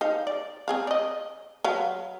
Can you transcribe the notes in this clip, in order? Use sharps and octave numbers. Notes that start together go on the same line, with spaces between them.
D#4 C5 F5
D5
C4 G#4 F5
D5 D#5
F#3 B4 F5